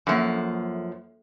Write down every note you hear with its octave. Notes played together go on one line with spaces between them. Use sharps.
F#2 F3 A#3 A4 E5